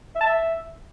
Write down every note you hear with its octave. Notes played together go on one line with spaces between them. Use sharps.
E5
A5
E5